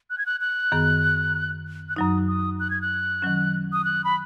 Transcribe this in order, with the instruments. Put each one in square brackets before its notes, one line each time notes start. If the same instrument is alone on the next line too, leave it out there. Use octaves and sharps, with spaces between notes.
[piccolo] F#6
G#6
F#6
F#6
[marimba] F#2 D#3 B3 G#4
[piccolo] F#6
[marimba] F#2 F#3 D#4 [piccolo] D#6
[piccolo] D#6
F#6
G#6
F#6
[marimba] D#3 F#3 C#4
[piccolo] D#6
F#6
B5